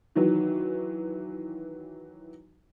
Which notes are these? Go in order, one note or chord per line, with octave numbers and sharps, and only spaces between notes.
D#3 E3 F#3